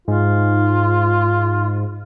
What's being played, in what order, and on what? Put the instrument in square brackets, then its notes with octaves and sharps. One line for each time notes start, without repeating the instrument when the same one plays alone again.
[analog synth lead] G#2 [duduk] F4